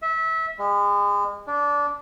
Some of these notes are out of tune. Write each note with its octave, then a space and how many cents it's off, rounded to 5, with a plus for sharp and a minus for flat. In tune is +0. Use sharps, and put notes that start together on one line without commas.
E5 -25
G#3 -35
D4 -20